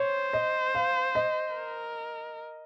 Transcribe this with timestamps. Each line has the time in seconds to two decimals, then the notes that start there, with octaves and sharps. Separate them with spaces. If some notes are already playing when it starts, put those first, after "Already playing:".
Already playing: C5 C#5
0.33 D#5
0.75 F5
1.15 D#5
1.56 A#4